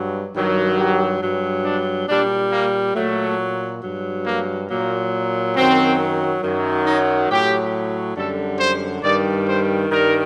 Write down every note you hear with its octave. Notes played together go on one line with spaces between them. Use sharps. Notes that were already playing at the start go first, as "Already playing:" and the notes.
Already playing: G2 F#3
G2 D#3 F#3
G4
G2 F#3
D4
A#2 G3 D4
A#3
A#2 F#3 A3
G2 F#3
A#3
A#2 F#3 A#3
F#2 D#3 F#3 C4
F#2 D#3 F#3
D#4
A2 F#3 G4
F#2 D3 G3 A4
C5
G2 D#3 G3 D5
C5
G2 D#3 G3 A#4